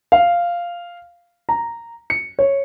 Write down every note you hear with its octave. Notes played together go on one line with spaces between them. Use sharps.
F5
A#5
C#7
C#5